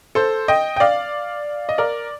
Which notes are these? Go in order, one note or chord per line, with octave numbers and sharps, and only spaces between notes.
A4 C5
D#5 G5
G5
D5 F5
D#5
A#4 D5